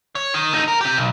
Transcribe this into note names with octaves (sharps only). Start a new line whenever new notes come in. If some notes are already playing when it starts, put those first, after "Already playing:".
C#5
D#3
A3 D#4
F2 A#4
C4 G4
B1